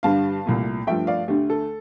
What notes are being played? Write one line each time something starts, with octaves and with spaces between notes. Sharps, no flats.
G2 D3 G3 F5 A5
C2 A#2 A3
G2 F3 A3 E5 G5
D5 F5
D2 D3 A3 G4
A4